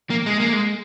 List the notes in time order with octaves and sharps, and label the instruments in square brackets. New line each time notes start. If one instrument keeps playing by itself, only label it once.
[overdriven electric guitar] A#3
G#3
A#3
G#3